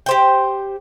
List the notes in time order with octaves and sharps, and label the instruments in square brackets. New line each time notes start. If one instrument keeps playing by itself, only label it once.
[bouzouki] G4 C5 G5